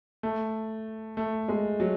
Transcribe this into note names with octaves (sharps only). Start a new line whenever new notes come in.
A3
A3
G#3
F#3